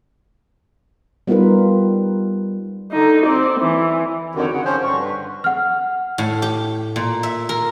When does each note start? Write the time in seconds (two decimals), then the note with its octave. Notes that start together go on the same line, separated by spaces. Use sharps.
1.27 G3 B3 D#4 F4 A#4 B4
2.92 D3 D#4
3.25 C4 D5
3.60 E3
4.35 F2 D3 D#3 F#4 G4 C#5
4.51 C#3 F#5
4.65 F3 C#4 C5 G5
4.82 G2 D3 C#6
4.98 B4
5.44 F#5 F6
6.18 A2
6.42 G4
6.96 A#2
7.23 E5
7.49 A#4